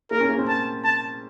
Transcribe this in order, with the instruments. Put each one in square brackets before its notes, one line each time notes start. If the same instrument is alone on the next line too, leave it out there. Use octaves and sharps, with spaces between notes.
[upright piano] A#3 [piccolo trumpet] A#4
[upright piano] C#4
A#3
C4
[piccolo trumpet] A5
A5